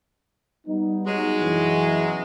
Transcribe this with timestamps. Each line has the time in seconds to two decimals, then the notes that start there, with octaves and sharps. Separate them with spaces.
0.67 G3 B3 D#4
1.06 F#3 G#3
1.40 F#2 B2 E3